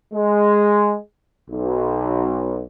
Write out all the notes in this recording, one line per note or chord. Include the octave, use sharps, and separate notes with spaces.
G#3
B1